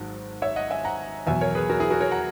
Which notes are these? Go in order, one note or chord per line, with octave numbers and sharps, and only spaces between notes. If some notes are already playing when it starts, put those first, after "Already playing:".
Already playing: G#1 G#2 D#3 F#3
C#5 E5
D#5 F#5
E5 G#5
F#5 A#5
E2 B2 F#3 E5 G#5
A#4 C#5
G#4 B4
F#4 A#4
E4 G#4
F#4 A#4
A#4 C#5
F#5 A#5